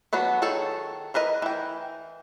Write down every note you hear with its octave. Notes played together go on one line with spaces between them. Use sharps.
F#3 B3 D4 F#4
D#3 G#4 A4 C#5
E3 A#4 B4 D#5
E3 G5